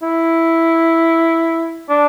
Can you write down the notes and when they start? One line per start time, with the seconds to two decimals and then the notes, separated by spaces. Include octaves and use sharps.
0.03 E4
1.89 D4